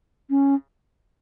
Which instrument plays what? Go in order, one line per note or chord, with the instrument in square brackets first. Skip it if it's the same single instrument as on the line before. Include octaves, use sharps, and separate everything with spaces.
[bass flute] C#4